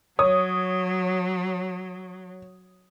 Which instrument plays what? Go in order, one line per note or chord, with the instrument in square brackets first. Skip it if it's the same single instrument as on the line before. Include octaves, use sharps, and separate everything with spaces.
[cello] F#3 [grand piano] C#5 D#6